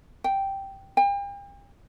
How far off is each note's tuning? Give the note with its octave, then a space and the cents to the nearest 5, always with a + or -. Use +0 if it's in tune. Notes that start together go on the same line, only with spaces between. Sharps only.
G5 -5
G5 +40